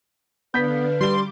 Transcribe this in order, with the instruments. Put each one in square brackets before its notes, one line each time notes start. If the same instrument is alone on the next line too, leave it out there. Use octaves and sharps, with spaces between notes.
[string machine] D3 D4 F5 [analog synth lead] B3 [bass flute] B4 [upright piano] G6 B6
[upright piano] G3 G7 [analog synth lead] C6 [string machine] D6